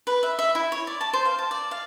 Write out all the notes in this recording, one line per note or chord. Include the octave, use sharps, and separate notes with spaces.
B4
E5
E5
E4
C#5
D5
A5
C5
F5
A5
D5
F5